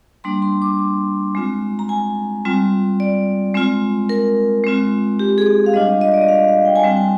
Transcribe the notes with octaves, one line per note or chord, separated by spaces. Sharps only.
G3 A#3 D4 C6
C6
D6
D6
G#3 C4 F4
A#5
G#5
G3 C4 F4
D5
G#3 C4 F4
A#4
G#3 C4 F4
G4
G#4
F5
G3 D4 F4 D#5
D#5
D5
D#5
F5
F5
G5
G#5
G3 C4 F4 G5
G#5